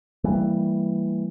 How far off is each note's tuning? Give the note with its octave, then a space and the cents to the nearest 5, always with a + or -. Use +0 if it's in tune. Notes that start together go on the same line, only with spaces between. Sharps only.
E3 +0 G3 +0 A#3 -25